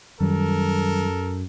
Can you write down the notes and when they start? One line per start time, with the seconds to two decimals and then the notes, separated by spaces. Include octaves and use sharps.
0.20 F#2 D#3 F#3 G3 A4 A#4